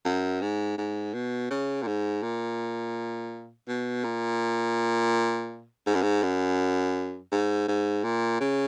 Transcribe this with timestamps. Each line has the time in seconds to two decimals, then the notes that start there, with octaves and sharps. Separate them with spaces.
0.05 F#2
0.41 G#2
0.78 G#2
1.14 B2
1.50 C#3
1.83 A#2
1.87 G#2
2.23 A#2
3.68 B2
4.04 A#2
5.86 G#2
5.94 F#2
6.02 G#2
6.23 F#2
7.32 G#2
7.68 G#2
8.04 A#2
8.40 C#3